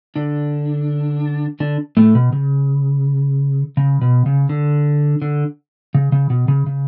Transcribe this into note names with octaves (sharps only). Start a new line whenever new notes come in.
D3 D4
D3 D4
A2 A3
B2
C#3
C#3
B2
C#3
D3
D3
C#3
C#3
B2
C#3
C#3